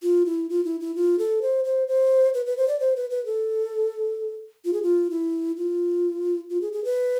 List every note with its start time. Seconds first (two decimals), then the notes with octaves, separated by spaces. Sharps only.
0.03 F4
0.26 E4
0.50 F4
0.65 E4
0.81 E4
0.96 F4
1.19 A4
1.42 C5
1.65 C5
1.88 C5
2.34 B4
2.46 B4
2.57 C5
2.68 D5
2.80 C5
2.96 B4
3.10 B4
3.26 A4
4.65 F4
4.73 G#4
4.83 F4
5.10 E4
5.57 F4
6.50 F4
6.62 G#4
6.73 G#4
6.85 B4